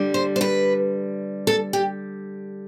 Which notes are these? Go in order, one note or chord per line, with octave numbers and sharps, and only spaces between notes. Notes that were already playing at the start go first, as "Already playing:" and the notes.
Already playing: D3 G3
C5
C5
B4
A4
G4